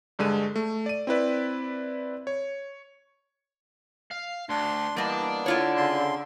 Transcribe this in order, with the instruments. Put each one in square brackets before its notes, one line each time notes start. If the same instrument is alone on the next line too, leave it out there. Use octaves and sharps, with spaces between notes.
[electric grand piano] G2 D3 G#3 D#7
A3
D5 D#7
C4 E4 B4 D5
C#5
[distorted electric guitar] F5
[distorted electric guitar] D2 [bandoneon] D4 C6
[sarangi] E3 [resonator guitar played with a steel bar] G3 D#5 [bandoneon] A#3 B3 [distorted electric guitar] D5 A5
[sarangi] D3 [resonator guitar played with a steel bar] E4 F4 C#5
[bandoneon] C#3 C6